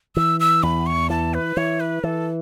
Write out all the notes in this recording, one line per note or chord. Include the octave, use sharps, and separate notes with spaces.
E3 E6
E6
E2 B5
C#6
E3 A5
B4
E3 C#5
B4
E3 A4